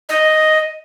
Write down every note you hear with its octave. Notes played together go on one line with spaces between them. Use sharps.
D#5